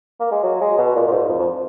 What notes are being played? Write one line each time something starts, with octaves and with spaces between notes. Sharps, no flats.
A#3
G#3
F#3
G#3
B2
A#2
A#2
G#2
F2
F2